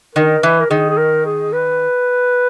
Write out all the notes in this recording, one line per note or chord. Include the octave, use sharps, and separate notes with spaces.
D#3 A#4
E3 B4
A#4
D#3 G#4
G#4
A#4
G#4
B4